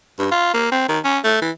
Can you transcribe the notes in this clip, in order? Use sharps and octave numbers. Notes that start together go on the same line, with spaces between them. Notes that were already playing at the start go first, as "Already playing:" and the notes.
G2
F4
A#3
C4
D#3
C#4
A3
E3